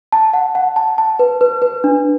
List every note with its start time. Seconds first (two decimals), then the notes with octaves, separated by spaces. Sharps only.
0.12 A5
0.34 F#5
0.55 F#5
0.76 A5
0.98 A5
1.19 B4
1.41 B4
1.62 B4
1.84 D4